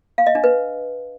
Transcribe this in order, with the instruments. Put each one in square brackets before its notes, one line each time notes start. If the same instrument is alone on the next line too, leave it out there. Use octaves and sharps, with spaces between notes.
[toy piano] F5
D#5
D4
B4